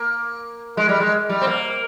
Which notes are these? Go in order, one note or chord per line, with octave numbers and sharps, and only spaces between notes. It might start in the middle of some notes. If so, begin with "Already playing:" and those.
Already playing: A#3
G#3
G3
G#3
G3
C4
A#3